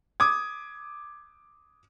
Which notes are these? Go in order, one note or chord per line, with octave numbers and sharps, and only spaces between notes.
D6 D#6 G#6